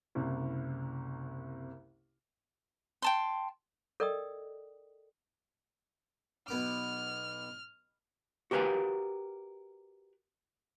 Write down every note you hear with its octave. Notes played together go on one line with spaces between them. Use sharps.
F#1 C2 C3
G5 A5 C6
A4 A#4 D5 D#5 G5 D#6
B1 B3 D6 F6
F#4 G4 A#4 B4 F5 G#5